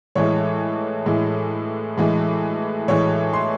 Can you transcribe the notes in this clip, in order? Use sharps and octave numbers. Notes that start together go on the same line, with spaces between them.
A2 E3 G#3 C#5
A2 E3 G#3
A2 E3 G#3
A2 E3 G#3 C#5
C6